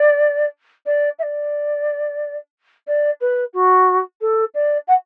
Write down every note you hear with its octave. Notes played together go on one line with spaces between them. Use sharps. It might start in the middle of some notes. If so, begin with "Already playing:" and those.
Already playing: D5
D5
E5
D5
D5
B4
F#4
A4
D5
F#5